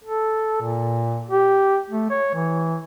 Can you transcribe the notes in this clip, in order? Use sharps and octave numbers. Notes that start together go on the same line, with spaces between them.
A4
A#2
G4
A3
C#5
E3